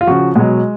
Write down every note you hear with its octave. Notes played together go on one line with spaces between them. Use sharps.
F4
C#3 F3 F#4
B2 F#3 G#3